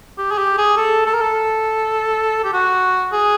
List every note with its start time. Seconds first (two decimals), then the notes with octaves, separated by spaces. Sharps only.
0.18 G4
0.31 G#4
0.38 G4
0.58 G#4
0.77 A4
1.06 A4
1.13 A#4
1.21 A4
2.44 G4
2.53 F#4
3.13 G#4